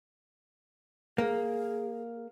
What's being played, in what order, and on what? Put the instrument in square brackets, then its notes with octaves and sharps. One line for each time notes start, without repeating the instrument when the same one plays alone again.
[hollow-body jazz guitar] A#3 [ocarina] G#4